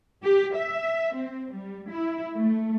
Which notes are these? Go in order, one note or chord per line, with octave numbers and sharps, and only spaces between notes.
G4
E5
C4
G3
E4
A3